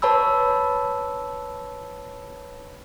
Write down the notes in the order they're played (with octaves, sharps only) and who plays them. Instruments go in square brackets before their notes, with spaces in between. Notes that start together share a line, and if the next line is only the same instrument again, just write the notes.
[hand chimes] B4 C#5 A5 B5 E6